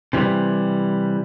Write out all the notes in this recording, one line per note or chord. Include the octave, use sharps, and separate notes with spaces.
C3 E3 G3